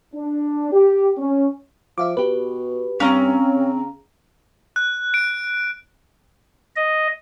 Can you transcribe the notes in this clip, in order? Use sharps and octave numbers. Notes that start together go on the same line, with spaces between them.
D4
G4
C#4
F3 E5 F5 D6
B2 G4 B4
G2 C4 C#4 F5 A#5
C#3
F#6
D7
D#5